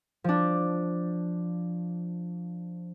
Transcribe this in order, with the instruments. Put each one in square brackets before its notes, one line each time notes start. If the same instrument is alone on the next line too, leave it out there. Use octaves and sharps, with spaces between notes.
[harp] F3 D4